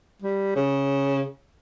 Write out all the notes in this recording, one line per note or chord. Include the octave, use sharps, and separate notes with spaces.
G3
C#3